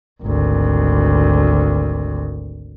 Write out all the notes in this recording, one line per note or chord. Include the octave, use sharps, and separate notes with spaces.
G#1 D2